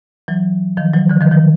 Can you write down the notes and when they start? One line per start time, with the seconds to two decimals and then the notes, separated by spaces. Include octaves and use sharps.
0.28 E3 F#3
0.77 D#3 F3
0.93 E3 F#3
1.10 D3 E3
1.21 D#3 F3
1.31 D#3 F3